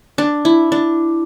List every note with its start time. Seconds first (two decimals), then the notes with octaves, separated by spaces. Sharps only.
0.18 D4
0.45 E4
0.72 D4